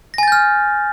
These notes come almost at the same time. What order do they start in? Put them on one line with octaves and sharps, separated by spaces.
A#6 G#5 A6 G6 F6